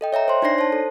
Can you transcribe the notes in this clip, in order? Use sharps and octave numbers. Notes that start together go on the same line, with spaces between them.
A4 D#5 G5
C#5 E5 G5 A#5
C5 C6
D4 D#4 C#5 D5 A#6 C7
C5 A5
A4